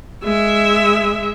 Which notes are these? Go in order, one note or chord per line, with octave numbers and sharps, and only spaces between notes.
G#3 E5